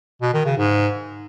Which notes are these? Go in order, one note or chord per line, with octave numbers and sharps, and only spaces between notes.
B2
D#3
C#3
G#2